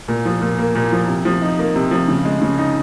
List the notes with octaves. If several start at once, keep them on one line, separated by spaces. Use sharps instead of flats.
A#2
F3
A#2
A#3
A#2
F3
C3
F3
D#4
A#3
C3
F3
C#3
G#3
C#3
D#4